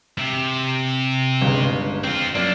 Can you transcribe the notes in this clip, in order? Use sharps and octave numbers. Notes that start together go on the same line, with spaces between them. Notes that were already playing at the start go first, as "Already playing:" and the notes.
C3
G1 C#2
C4 F4
F#2 A#3 D4 D5